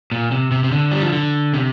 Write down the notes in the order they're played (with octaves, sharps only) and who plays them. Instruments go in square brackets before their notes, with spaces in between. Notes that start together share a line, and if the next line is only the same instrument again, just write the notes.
[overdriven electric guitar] A#2
C3
C3
C3
D3
G3
F3
D3
C3